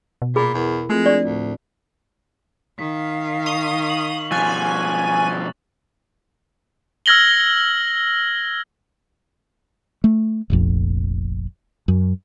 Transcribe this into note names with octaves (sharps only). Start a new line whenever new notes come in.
B2
A#2 G#4 B5
E2 E4 A#4
F3 G#3 A3 C4 F4
D4 D5
D2 A2
D#3 F5 B6
C#6 D#6 F7 G7
F#7
B2 F3 G#5 C#6 F#6 A6
E6 F6 G#6 A#6 F#7 G7
A3
F1 A#1 F2
F#2